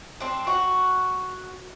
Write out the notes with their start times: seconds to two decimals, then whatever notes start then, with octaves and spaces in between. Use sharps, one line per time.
0.20 C4 D4
0.47 F#4